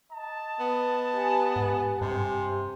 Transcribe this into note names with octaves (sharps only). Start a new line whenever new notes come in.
D#5 A5
B3
G4 G#5
G#2
G2 C3